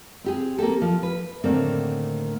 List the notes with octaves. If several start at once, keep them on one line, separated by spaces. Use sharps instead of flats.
C4 G4 G#4
A#3 C4 G4 A4
F3
B4
A2 D3 D#3 A#3 C4